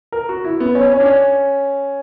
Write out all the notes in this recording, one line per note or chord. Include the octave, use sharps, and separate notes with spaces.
A#4
F#4
E4
B3
C#4
C#4
D4
C#4